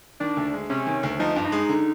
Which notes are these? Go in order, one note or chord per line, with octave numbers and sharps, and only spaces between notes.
D#3 D4
D2
G#3
C3 C#4
D#3
D2
F3 D#4
G2
D#4
G#3
D3